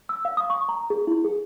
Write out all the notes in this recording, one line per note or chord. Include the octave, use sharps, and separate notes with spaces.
E6
F5
D#6
C#6
A#5
G#4
E4
G#4